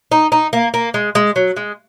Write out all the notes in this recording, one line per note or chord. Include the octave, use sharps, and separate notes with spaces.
D#4
D#4
A#3
A#3
G#3
G#3
F#3
G#3